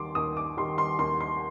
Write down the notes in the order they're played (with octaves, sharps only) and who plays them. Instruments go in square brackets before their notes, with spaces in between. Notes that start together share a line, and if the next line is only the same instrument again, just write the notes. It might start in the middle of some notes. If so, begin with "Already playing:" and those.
Already playing: [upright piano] D#2 D#3 G3 C6 D6
D#2 D#6
D6
D#3 G3 C6
C6
D#2 C6
C6